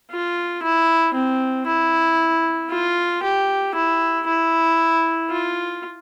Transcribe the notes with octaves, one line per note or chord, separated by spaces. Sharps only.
F4
E4
C4
E4
F4
G4
E4
E4
F4